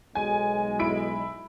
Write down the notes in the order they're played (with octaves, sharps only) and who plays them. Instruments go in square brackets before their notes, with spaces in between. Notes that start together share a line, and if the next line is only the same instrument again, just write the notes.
[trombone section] B1 G#3 [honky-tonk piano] G#5
[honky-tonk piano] E4 B5 D7